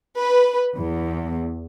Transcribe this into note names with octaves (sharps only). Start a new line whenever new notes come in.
B4
E2